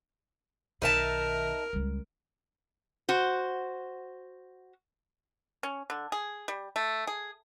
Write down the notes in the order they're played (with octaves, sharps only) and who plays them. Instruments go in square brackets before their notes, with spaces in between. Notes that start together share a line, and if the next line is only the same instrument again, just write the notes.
[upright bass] B1 D#3 [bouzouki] D#4 E5 A5 [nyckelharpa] A#4
[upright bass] C#2 G3
[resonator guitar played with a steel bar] F#4 C5
[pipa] C#4
D3
G#4
G3
A3
G#4